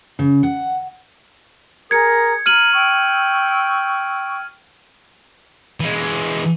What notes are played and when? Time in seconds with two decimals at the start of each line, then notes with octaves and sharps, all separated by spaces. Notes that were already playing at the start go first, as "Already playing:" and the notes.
0.19 C#3
0.43 F#5
1.91 G#4 A#4 D#6 G#6 C#7
2.46 A#5 F6 D#7 F#7
2.73 G5 C#6 E6
5.80 E3 G#3